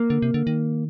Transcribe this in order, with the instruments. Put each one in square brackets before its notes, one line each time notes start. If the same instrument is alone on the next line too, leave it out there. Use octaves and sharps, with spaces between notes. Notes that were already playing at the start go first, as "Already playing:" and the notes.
Already playing: [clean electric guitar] A#3
[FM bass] D3
C3
D3
D#3